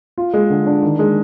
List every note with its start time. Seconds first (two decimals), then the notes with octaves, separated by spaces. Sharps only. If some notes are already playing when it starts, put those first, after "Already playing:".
0.18 F4
0.34 G#3
0.50 D3
0.66 D4
0.82 D#3
0.99 G#3